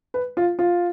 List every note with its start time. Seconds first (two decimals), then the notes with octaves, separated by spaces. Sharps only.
0.14 B4
0.37 F4
0.59 F4